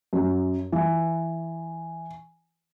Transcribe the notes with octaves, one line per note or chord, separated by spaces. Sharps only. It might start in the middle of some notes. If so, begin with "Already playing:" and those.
F#2
E3